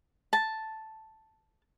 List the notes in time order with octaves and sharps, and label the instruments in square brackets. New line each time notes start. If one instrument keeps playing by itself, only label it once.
[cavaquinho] A5